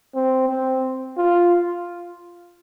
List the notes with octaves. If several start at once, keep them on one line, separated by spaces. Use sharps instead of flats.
C4
C4
F4